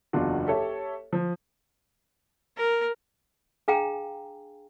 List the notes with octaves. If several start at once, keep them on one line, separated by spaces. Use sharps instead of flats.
F#1 E2 D4 F4 F#4
G4 A4 C#5 E5
F3
A#4
D4 G#4 F5 G5 G#5 A#5